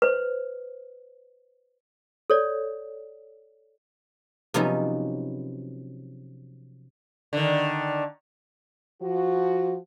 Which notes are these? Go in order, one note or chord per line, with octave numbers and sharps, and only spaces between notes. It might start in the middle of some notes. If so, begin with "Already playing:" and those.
B4 C5
A4 C#5 D5
C3 F3 F#3 B3 C#4 D#4
D3 D#3
F3 F#4